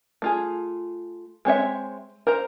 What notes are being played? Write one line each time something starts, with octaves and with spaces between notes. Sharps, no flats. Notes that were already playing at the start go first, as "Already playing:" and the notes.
A3 F4 G#4
G#3 C4 C#5 E5
A#4 C5 A#5